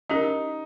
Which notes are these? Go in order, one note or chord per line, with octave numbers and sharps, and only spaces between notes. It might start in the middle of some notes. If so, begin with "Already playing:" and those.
C#4 D#4 G4 A#4